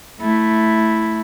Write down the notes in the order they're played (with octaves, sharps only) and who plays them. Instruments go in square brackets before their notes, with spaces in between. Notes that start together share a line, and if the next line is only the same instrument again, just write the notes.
[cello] A3 E4